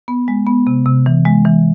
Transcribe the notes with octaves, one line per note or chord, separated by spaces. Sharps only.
B3
G#3
B3
C3
C3
E3
G#3
E3